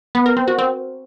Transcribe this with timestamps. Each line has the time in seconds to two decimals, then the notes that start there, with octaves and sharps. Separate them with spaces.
0.15 B3
0.26 A#4
0.37 C4
0.48 F#4
0.59 C4